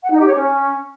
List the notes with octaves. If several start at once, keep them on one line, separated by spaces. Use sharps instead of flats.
F#5
D#4
G4
C#5
C#4